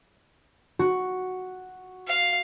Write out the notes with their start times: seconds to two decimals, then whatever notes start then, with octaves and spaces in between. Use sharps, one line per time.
0.79 F#4
2.08 F5